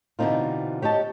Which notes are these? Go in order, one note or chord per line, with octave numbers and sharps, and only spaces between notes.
B2 D3 E3 C4 D#4 F4
G4 C#5 D#5 A5